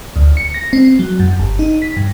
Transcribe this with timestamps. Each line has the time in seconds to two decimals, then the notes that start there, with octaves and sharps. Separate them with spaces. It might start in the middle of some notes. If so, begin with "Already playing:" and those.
0.16 D2
0.37 C#7
0.54 A#6
0.73 C4
0.99 F#3
1.20 F#2
1.40 G1
1.59 D#4
1.82 B6
1.97 G2